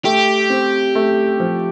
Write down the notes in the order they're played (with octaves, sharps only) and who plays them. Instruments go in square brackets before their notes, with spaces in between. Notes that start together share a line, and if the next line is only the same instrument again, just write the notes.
[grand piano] A3 [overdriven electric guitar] G4
[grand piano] C4
A3
F3